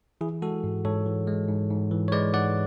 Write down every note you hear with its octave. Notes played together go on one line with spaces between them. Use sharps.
E3 E4 G#4
G#3 F#4 A4
G#2
G#2 A4 C#5
E3
G#3
G#2
G#2
E3
C#5
G#3 B4 D5
G#2 D5 F#5